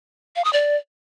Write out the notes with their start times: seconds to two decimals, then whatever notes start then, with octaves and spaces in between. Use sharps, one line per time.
0.36 F5
0.44 D#6
0.53 D5